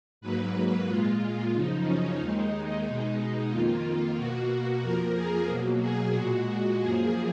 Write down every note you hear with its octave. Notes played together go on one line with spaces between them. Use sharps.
G#2 F#3 A#3 B4
A#2 G#3 F4
F#2 C#3 F3 D#4
C#4
D#2 D#3 G#3 D#4
B2 G#3
F2 D#3 A#3 F4
B2 A#3 F#4
F2 F3 A#3 A#4
G#4
B2 F#3 A#3
G#4
A#2 G#3 F#4
F#2 F3 A#3 G#4